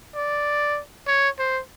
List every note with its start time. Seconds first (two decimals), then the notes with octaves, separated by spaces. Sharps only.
0.16 D5
1.08 C#5
1.39 C5